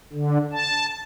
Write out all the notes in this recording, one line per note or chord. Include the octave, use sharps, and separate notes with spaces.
D3
A5